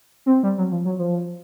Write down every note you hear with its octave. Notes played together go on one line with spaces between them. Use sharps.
C4
G3
F#3
F3
F#3
F3